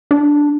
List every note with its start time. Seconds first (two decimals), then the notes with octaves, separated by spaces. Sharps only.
0.11 D4